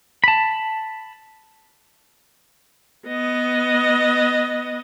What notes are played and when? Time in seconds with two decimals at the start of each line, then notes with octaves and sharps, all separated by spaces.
0.24 A5 B5
3.08 B3 D#5